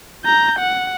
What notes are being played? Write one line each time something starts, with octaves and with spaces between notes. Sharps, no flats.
A#5 G6
F#5